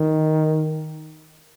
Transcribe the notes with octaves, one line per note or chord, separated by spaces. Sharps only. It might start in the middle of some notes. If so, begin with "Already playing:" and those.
Already playing: D#3